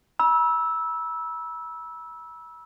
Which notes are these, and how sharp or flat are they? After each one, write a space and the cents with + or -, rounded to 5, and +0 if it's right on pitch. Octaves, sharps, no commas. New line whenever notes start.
B5 -40 E6 -10